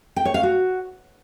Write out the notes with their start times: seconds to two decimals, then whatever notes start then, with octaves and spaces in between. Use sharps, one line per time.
0.16 G5
0.25 C#5
0.34 F5
0.43 F#4